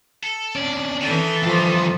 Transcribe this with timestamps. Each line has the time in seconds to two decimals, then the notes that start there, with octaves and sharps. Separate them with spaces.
0.23 A4
0.55 C#4 D4 D5
1.01 D#3 E3 A4
1.43 G2 F3 F4